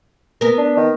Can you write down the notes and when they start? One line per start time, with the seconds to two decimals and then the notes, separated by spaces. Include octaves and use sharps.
0.41 B3 A#4
0.58 D4
0.77 D#3